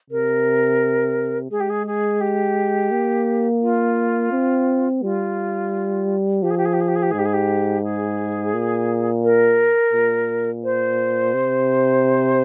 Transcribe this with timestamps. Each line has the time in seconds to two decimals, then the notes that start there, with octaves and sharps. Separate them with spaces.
0.10 C3 A#4
1.51 G#3 G#4
1.60 G4
1.69 G#4
1.86 G#4
2.20 G4
2.91 A#3
3.61 F4
4.32 C4
5.02 G3 F4
6.42 F3 G4
6.50 G#4
6.57 G4
6.65 G#4
6.73 G4
6.80 G#4
6.88 G4
6.95 G#4
7.02 G4
7.11 G#2 G#4
7.18 G4
7.25 G#4
7.33 G4
7.83 G#4
8.54 A#2
9.23 A#4
9.93 A#2
10.64 C5
11.34 C3